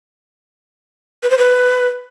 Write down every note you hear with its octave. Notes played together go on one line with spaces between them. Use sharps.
B4
C5
B4